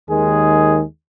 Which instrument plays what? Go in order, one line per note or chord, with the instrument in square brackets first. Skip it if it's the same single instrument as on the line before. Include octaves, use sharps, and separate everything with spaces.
[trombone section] D#2 D#3 G#3 G#4